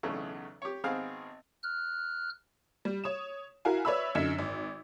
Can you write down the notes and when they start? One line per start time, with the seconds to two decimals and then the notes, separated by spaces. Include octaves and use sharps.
0.03 B1 E2 C#3 A3
0.62 G4 C#5
0.84 G#1 B3 C4 G#4 F5
1.63 F6 F#6
2.85 G3
3.04 C#5 D#6 E7
3.65 E4 F#4 A#4 F5 G#5
3.85 B4 C#5 D5 E5 B5 E6
4.15 F#2 D3 D#4 G#6 B6 E7
4.39 G#1